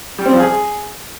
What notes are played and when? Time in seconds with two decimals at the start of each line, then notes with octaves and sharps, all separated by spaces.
0.18 G3
0.26 C4
0.33 F3
0.40 G#4